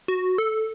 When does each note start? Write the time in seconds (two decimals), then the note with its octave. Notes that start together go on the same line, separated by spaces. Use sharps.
0.08 F#4
0.38 A4